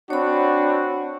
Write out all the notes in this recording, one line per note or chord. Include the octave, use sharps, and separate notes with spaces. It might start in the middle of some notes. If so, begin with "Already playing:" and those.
C4 D4 F#4 C#5 B5